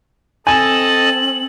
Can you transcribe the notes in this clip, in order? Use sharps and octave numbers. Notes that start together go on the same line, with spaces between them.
C4 A4 D#5 G#5 A5 F#7